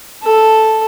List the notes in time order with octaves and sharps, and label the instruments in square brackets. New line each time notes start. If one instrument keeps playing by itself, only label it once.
[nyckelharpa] A4